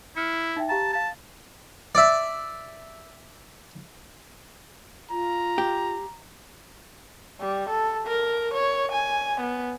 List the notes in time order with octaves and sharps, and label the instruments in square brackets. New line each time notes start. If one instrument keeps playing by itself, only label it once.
[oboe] E4 [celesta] F6 C#7
[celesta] D#4 E5 G5
[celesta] G4 F5 A#5 [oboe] A5
[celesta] F5 A6 [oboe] A5
[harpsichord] D5 E5
[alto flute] F4 [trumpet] A#5
[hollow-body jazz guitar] G4
[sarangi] G3
A4
A#4
C#5
G#5
B3